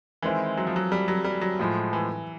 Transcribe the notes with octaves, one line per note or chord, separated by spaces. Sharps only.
D#3 E3 G#3 C4 E4
F#3
F3
F#3
G3
F#3
G3
F#3
A2 F3 G#3
E3